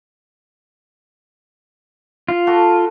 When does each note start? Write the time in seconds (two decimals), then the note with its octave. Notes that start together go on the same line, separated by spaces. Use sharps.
2.29 F4
2.47 F#4 A4